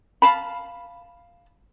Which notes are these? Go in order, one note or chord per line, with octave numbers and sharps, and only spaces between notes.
F5 A5 B5